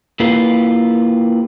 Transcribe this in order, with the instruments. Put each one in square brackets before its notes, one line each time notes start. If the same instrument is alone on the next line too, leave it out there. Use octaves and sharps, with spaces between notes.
[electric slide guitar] A#3 E4 F4 G4 B4